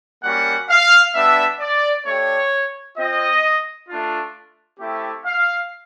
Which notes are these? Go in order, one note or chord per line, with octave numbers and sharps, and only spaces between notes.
G3 A#3 C#4 F#4 F#5
F5
G3 B3 D4 E5
D5
A3 D4 G4 C#5
C4 F4 D#5
A3 D4 F4
A3 C4 E4 G4
F5